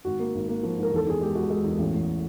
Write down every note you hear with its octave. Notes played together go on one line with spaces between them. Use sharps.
G#1 F#4
A#3
G#1
A#3
F3
G#2
A#4
E2 A4
E2 G#4
G#3 G4
G#3 F#4
G#3
E2
A1
A1